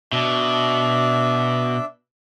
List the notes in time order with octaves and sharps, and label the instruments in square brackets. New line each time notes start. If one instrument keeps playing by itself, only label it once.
[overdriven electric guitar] B2 [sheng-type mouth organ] D4 E5